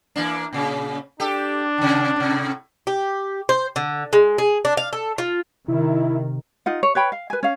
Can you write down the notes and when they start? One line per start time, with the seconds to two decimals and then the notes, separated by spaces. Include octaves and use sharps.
0.16 E3 A#3 D4
0.53 A#2 C#3
1.20 D4 G4 A4
1.78 C3 D#3
2.16 A2 C3
2.87 G4
3.49 C5
3.76 D3
4.13 G#3
4.38 G#4
4.65 D4
4.77 F5
4.93 A4
5.18 F4
5.68 C3 D#3 E4
6.66 D#4 F4 F#5
6.83 C#5
6.95 B4 C#5 G5 B5
7.12 F5
7.30 B4 G#5
7.43 C#4 F5